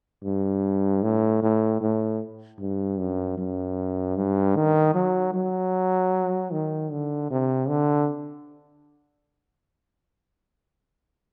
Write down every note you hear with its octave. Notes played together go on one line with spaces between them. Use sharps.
G2
A2
A2
A2
G2
F#2
F#2
G2
D#3
F#3
F#3
D#3
D3
C3
D3